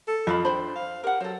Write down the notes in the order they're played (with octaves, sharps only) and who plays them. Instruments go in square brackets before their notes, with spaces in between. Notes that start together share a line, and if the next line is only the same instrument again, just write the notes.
[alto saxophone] A4
[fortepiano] F2 [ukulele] D#5 F5 B5
[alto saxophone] D4 [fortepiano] C5 [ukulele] G5 B5
[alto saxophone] F5
[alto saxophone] G4 [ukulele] A#4 F#5
[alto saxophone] F#3 [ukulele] A4 C5